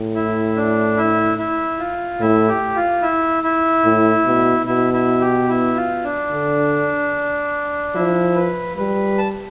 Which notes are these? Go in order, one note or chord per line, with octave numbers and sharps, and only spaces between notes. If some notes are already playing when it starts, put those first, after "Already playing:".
Already playing: A2
E4
D4
E4
E4
F4
A2 E4
G4
F4
E4
E4
A2
B2
B2 E4
E4
G4
E4
F4
D4
D3
F3 E4
B4
G3 B4
A5